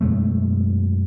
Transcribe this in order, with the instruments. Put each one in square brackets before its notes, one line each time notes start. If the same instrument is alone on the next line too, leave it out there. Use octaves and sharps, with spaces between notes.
[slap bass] F#2 B2 G#3 A3